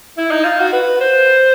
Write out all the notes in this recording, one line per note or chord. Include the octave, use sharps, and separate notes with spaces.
E4
D#4
F4
F#4
B4
C5